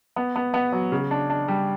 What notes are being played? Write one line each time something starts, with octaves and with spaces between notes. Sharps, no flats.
B3
B3
B3
F#3
C#3
D4
D4
G3